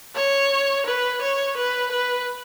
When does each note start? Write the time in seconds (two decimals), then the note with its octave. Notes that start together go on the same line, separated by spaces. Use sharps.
0.16 C#5
0.86 B4
1.22 C#5
1.57 B4
1.91 B4